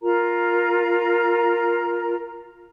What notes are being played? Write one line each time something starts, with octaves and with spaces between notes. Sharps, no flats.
F4 A#4 A#5